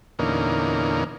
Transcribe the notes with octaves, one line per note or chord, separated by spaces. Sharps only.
E2 A#2 D3 A#3 C#4 D#4